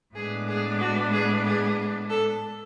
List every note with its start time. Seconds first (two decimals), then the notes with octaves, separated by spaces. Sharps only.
0.15 A2 G#3 B3 D4 G#4
0.48 G#4
0.80 F#4
1.13 G#4
1.45 G#4
2.10 A4